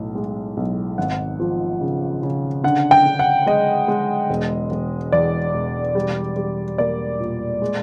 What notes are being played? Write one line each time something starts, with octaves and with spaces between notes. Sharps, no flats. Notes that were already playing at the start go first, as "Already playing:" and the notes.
Already playing: B1 A2
G#3
B1
G#1 F#5
F3
C#3
C#3
D3 F#5
G5
D3
F#5
G#3 D#5
G#3
E1
E1
E2 D5
E1
G3
G3
A#3 D5
A#2
G#3